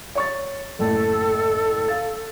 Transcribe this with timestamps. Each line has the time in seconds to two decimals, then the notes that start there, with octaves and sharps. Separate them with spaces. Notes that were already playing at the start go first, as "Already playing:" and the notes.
0.15 C#5 C#6 A6
0.79 F#1 A2 A4
1.88 F5 A6